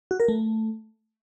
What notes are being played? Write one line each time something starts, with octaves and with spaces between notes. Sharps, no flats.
F#4
A#4
A3